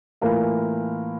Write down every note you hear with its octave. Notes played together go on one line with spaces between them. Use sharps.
A2 E3 A#3 F4 A#4